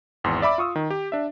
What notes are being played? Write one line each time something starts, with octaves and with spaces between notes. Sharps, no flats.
G#1 E2 C6
D5 E5 B5 D6
F4 C#6 D#6 E6
D#3
G4
D4 E5